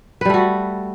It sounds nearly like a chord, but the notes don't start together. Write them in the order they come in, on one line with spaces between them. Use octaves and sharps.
B4 G3 A3 F#4